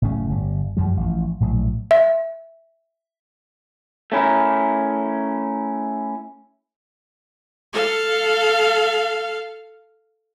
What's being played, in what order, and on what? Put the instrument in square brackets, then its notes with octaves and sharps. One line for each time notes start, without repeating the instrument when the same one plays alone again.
[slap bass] F#1 A2 C#3 C#4
G1 G3
F#2 F3 G3
A1 F3
A#1 A2 F#3
[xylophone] E5
[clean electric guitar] A3 C#4 E4 A#4
[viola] A4 F5